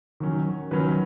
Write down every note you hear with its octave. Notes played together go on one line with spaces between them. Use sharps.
D#3 F#3 C#4
D#3 F#3 C#4 B4